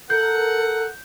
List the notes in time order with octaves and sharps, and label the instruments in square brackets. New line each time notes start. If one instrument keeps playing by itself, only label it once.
[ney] A4 [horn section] A#4 F#5 [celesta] G6